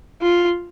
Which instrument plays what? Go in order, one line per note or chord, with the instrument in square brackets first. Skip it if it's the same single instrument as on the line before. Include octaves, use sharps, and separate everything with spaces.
[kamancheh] F4